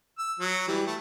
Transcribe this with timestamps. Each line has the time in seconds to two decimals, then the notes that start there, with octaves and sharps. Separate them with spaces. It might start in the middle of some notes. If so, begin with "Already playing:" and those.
0.18 E6
0.39 F#3
0.68 E3 G3
0.87 A3